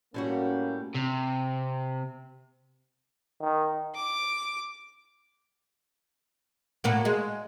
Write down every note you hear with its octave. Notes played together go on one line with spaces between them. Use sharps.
A2 G3 A#3 C#4 F#4
C3
D#3
D6
A2 A#3 F#4
G#3